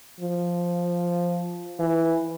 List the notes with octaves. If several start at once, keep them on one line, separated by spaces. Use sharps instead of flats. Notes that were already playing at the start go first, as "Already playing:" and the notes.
F3
E3